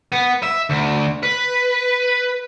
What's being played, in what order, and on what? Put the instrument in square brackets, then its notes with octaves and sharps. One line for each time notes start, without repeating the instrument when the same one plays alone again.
[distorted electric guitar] B3
E5
D2
B4